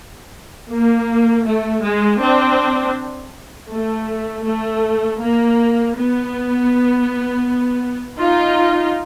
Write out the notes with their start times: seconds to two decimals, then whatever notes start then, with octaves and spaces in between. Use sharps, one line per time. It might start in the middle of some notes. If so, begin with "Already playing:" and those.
0.71 A#3
1.46 A3
1.83 G#3
2.20 C4 D4
3.70 A3
4.45 A3
5.20 A#3
5.95 B3
8.19 D#4 F4